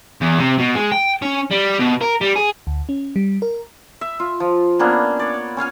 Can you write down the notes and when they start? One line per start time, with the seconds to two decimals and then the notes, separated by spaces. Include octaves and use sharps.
0.22 E2
0.40 C3
0.59 B2
0.76 G#3
0.92 G5
1.22 C#4
1.51 G3
1.79 B2
2.01 A#4
2.21 G3
2.36 G#4
2.67 D2
2.89 C#4
3.16 G3
3.42 A#4
4.01 E5
4.20 F4
4.40 F3
4.79 A#3 B3 C#4 D4
5.19 C#5 D5
5.57 C#4 C#5 F5 G#5